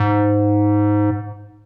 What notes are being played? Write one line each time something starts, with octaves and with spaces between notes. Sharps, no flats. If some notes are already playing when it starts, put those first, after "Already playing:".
Already playing: G#2